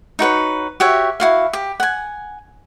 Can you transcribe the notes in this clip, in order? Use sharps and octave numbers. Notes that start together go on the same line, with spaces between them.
D#4 F#4 B4 C#5
F#4 G4 C#5 E5
E4 F#4 F5
G4
F#5 G#5